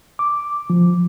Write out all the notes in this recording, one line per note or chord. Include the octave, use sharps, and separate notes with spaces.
D6
F3